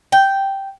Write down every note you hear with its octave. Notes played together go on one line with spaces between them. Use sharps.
G5